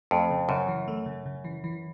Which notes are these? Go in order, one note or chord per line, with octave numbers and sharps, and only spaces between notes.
F2 A3
C#3
F#2 C#3
E3
A3
C#3
C#3
E3
E3